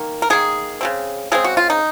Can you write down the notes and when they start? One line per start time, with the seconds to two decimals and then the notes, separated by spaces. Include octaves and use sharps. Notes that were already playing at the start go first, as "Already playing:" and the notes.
Already playing: D#3 A#3
0.22 A#4
0.30 D#3 A#3 G#4
0.81 C#3 G#3 C4
1.32 C#3 G#3 C4 G#4
1.44 F#4
1.57 F4
1.70 D#4